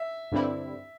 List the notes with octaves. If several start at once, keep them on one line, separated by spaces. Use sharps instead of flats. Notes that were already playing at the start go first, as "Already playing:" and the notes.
Already playing: E5
G2 D3 G3 C4 E4